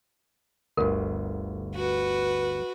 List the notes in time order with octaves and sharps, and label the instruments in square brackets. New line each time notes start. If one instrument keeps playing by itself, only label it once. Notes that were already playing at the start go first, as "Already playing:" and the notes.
[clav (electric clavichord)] G1 D2 [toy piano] A#4
[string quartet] F#4 B4